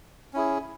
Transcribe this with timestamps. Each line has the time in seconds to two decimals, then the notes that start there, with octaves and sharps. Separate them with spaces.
0.33 C#4 E4 G#4